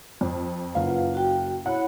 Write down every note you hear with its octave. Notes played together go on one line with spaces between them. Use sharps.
F2
F#1 F4 B4 F5 F#5
F#4 G5
E4 C#5 F#5 B5